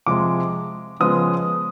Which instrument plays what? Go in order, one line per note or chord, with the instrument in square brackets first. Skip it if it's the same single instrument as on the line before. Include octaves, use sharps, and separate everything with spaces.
[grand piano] C3 F3 G#3 D6
C#3 F3 G#3 B3 D#6